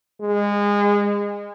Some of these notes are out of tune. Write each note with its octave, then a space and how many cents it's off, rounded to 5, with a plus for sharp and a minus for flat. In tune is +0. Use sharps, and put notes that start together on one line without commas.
G#3 -25